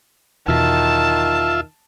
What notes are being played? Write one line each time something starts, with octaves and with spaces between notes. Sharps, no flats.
E2 B2 D#3 F4 E5 A5